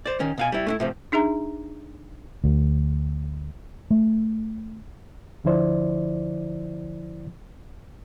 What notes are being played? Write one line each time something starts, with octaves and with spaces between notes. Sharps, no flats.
C5 D5
D#3 C#4
B2 F5 G#5
G3 E4
A3 D4 E4
A2 C3 F3
D4 D#4 G#4 E5 A#5
D2
A3
D2 D3 F3 E4 C5 D5